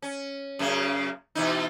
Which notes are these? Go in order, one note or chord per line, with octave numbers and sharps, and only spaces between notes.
C#4
F#2 C#3 A#3
B2 E3 D#4